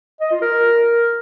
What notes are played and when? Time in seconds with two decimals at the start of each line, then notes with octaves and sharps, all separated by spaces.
0.20 D#5
0.31 F4
0.42 A#4